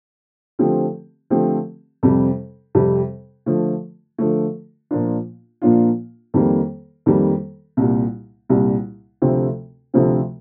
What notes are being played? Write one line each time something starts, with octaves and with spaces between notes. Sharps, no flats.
D3 F3 A3 C4 G4
D3 F3 A3 C4 G4
F2 C3 G3
F2 C3 G3
D3 F3 A3
D3 F3 A3
A#2 F3 A#3 D4 F4
A#2 F3 A#3 D4 F4
F2 D#3 G3 A#3
F2 D#3 G3 A#3
C2 A#2 G3
C2 A#2 G3
D2 C3 F3 A3 C4
D2 C3 F3 A3 C4